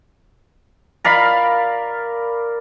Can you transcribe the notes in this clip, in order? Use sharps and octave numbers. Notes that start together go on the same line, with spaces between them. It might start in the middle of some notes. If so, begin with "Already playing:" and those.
A#4 D5 F5 B5